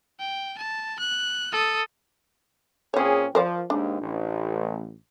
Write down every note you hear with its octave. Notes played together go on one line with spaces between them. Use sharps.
G5
A5
F#6
A4 D#6
A#2 C4 C#4 G#4 C#5
F3 A#4 C5 D5
D#2 G#2 D4
A1